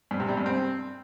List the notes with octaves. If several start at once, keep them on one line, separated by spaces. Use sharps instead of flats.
G2
C3
G3
G2
C4